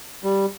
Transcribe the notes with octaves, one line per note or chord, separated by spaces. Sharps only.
G3